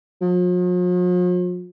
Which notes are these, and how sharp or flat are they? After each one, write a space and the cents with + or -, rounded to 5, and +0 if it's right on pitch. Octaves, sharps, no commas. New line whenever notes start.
F3 +45